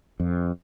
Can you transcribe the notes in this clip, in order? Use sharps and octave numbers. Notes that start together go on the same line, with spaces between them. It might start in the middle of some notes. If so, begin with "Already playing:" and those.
F2